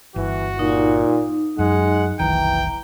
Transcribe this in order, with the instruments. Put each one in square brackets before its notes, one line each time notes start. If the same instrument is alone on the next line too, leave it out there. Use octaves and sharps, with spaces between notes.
[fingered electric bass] G1 [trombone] E3 [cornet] F#4
[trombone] A#2 [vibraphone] D#4
[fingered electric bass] F#2 [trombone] G#3 [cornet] F#5
[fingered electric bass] F1 B1 D#3 [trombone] E3 [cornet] G5 [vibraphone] A#5